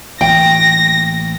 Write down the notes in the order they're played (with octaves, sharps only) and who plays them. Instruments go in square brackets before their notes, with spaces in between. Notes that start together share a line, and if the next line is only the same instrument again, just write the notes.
[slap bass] A1 E3 A#3 [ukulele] G5 [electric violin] A#6